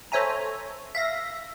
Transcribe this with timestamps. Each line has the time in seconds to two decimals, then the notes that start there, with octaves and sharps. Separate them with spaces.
0.12 A4 C5 C#5 E5 G#5 A#5
0.95 E5 F5 A#6